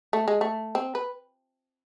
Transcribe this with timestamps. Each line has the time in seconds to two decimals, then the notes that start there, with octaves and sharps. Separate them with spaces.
0.13 A3
0.28 G#3
0.41 A3
0.75 C4
0.95 B4